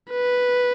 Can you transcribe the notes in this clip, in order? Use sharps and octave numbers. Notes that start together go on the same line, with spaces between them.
B4